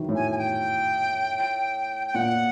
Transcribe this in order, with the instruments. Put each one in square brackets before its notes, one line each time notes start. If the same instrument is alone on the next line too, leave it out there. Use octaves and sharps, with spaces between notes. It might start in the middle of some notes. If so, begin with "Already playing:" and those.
Already playing: [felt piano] D#3 E3 F#3
A2
[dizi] G#5
G#5
G5
G5
[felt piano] A#2 [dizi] F#5